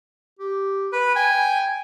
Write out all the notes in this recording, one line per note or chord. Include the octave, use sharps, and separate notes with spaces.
G4
B4
G5 G#5